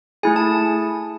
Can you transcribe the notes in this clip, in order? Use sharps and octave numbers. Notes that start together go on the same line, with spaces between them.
A3 E4 G#4 G#5
A5